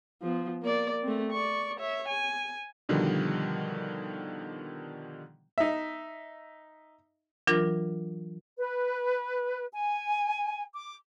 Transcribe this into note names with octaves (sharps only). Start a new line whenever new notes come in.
F3 B3
A#3 D5
A3 C4
D5 C#6
C#5 E5
G#5
B2 D3 D#3 F3 G3
D#4 E5
E3 F#3 D4 F4 A#4
B4
G#5
D6